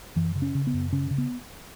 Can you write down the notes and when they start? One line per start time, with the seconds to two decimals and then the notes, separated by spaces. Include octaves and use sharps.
0.16 F#2 E3
0.35 C#3
0.42 C#4
0.55 C#3
0.67 B3
0.74 F#2
0.92 C#3 C#4
1.11 C#3
1.18 B3